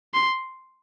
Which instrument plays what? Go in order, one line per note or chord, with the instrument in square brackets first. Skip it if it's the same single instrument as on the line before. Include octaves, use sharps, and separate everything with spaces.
[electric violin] C6